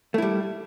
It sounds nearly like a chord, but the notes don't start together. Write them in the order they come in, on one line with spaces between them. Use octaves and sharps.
A3 E4 G3